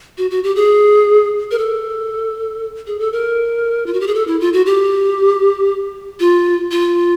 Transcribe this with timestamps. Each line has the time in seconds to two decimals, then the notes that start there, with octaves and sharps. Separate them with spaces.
0.18 F#4
0.31 F#4
0.44 G4
0.56 G#4
1.51 A#4
1.59 A4
2.87 G#4
2.99 A4
3.12 A#4
3.86 F4
3.93 F#4
4.01 G4
4.07 G#4
4.15 A4
4.27 E4
4.40 F4
4.53 F#4
4.66 G4
6.20 F4
6.71 F4